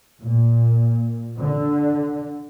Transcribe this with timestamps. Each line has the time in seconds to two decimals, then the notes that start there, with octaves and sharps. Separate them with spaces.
0.20 A#2
1.37 D3